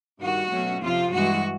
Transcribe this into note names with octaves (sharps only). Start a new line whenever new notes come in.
G2 D#3 G3 F#4
B2 F#3 A3 C#4
F2 C3 F3 F4
G2 E3 G#3 F#4